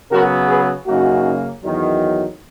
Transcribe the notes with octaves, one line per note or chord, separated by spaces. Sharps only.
C#3 F#3 B3 F#4 A#4
G#4 B4
F#2 C#3 F#3 A#3 D#4 F#4
E2 D#3 F#3